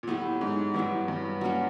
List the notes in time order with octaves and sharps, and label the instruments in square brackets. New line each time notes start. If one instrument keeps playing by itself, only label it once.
[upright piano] A#2
[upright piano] A2 [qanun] F#3 B3 E4 G4
[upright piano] G#2
[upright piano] G2 [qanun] F#3 B3 E4 G4
[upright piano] G2
[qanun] F#3 A#3 C#4 F#4